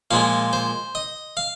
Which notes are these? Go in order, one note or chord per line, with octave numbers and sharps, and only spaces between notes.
A#2 F3 G#3 F5
C5
D#5
F5